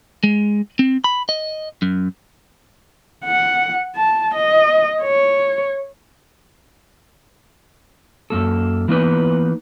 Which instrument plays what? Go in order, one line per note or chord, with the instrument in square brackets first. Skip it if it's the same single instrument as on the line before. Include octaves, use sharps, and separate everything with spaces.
[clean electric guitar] G#3
C4
B5
D#5
F#2
[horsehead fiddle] F#5
A5
D#5
C#5
[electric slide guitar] F#2 A#3 A4
E3 A#3 B3 D#4 B4